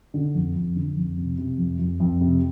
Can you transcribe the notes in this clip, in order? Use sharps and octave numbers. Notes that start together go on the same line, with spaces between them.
D3
F2
F2
D3
F2
C3
C3
F2
F2
F2
C3